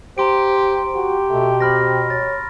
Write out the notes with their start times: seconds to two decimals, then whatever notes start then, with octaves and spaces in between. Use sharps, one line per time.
0.18 G4 C5 A#5 C6 D7
0.95 F#4 G4
1.30 B2 A3
1.60 C4 B5 F6 A#6
2.10 C#5 A6